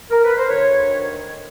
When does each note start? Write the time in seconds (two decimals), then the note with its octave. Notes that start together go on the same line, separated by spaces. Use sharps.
0.11 A#4
0.25 B4
0.37 C5
0.50 D2 C#5
0.69 D2
0.88 D#3